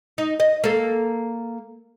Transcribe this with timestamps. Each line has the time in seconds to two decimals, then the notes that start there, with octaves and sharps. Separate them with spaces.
0.18 D#4
0.40 D#5
0.64 A#3 A4